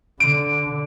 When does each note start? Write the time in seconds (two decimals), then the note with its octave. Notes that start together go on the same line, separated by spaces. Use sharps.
0.20 D3 D7